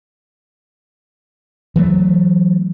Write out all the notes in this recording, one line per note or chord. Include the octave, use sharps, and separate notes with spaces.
E3 F#3 A3